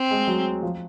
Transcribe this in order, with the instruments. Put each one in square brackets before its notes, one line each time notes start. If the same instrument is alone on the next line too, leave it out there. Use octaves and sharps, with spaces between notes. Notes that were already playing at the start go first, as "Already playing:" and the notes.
Already playing: [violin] C4
[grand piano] G#3
F#3
F3